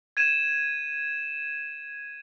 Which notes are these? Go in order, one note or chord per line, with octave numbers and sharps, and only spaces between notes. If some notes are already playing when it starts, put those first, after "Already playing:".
G#6 D#7 E7